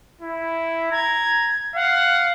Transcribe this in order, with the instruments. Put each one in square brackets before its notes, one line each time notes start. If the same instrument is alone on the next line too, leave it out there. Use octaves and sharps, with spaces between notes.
[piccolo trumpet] E4
[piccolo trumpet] A#5 [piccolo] G#6
[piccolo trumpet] F5 [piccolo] F#5